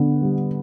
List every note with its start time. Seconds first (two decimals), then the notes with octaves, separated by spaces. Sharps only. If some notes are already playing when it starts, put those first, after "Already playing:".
Already playing: D3 B3
0.22 G3